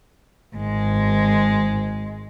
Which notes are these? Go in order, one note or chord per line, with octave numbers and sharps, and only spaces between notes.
G#1 G#3